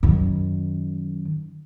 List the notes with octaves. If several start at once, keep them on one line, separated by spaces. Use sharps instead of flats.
F#2 D#3